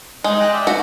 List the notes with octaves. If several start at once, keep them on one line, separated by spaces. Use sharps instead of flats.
G#3 D#4
D#5 G5 F#6
D5 E5
F#4